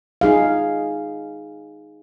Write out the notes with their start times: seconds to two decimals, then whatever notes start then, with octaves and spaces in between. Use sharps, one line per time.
0.21 D#4 G#4 F5